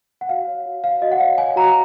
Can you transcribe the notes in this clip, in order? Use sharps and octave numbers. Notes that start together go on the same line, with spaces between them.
F#5
F#4 F5
C#5
F#4
C#5 F5
F#4 D#5
F#5
C#5 F5
C#5 G#5
F#4 A#5